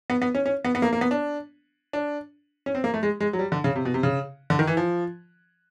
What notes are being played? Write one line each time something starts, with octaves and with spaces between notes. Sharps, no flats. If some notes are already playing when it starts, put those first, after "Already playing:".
B3
B3
C#4
C#4
B3
B3
A#3
A#3
B3
D4
D4
C#4
C4
A#3
A3
G#3
G#3
F#3
G3
D3
C#3
C3
B2
C3
C#3
D3
D#3
E3
F3